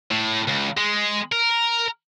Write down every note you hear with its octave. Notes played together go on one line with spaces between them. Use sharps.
A2
C#2
G#3
A#4